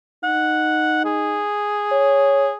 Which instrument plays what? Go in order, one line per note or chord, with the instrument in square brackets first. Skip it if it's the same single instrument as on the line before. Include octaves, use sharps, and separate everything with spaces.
[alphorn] D#4 [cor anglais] F#5
[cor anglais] G#4
[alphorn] C#5